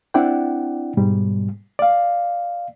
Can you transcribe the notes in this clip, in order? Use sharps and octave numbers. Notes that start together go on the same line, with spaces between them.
C4 D4 E4 D5 F#5 G5
G#2 B2 G3
D5 F5